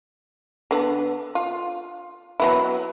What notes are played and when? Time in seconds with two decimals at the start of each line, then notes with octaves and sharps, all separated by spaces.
0.71 D3 B3
1.35 F4
2.40 F#3 B3 E4